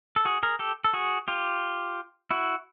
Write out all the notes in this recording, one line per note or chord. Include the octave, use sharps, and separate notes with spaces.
A4
F#4 G#4
G#4 A#4
G4 A4
A4
F#4 G#4
F4 G4
E4 F#4